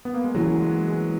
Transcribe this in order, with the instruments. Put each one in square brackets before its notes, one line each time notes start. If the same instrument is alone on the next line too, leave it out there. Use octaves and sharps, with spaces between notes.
[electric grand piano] B3
A#3
G#3
[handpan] E3 A#3 C#4 E4 G#4 [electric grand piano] F#3
[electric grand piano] G#3
G#3